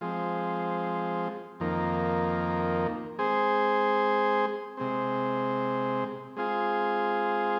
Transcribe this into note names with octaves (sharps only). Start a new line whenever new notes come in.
F3 G#3 C4
F2 D#3 A#3
G#3 C4 G#4 C5
C3 G#3 C4
G#3 C4 F4 G#4